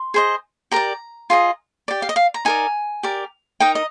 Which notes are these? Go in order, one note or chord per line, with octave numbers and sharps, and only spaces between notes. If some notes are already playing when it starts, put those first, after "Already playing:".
Already playing: C6
G#4 C5 D#5
G4 A#4 D5 A#5
F4 G#4 D#5
G4 D5
F5
D#5
F5
A#5
D#4 A#4 D5 G#5
G4 A#4 D5
D#4 A#4 D#5 G5
D#5